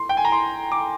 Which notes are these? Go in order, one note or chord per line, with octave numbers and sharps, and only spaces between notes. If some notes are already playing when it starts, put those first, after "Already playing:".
Already playing: C6
G5
G#5
A#5
C6
D6